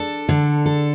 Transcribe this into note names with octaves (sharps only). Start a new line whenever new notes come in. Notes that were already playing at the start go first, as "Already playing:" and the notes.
Already playing: D4 A4
D3
A4